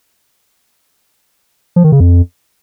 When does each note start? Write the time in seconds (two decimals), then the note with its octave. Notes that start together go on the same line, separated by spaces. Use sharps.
1.76 F3
1.84 D#3
1.92 C#3
2.00 F2